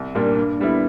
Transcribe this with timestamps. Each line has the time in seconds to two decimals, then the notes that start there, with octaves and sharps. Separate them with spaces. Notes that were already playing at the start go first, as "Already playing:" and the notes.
Already playing: C2
0.15 A#2 G3 A#3 D4
0.37 G2
0.59 D3 G3 B3 E4